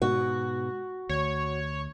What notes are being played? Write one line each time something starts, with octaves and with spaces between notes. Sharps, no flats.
G#2 B2 F#4
D2 C#5